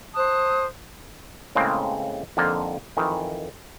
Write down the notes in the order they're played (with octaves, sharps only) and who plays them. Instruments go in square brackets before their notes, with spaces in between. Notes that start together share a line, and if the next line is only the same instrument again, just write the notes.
[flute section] C5 A5 D#6 F#6
[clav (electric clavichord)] A2 C#3 G#3 A#3 C4
F2 D3 A#3 D#4 F4
F2 D#3 E3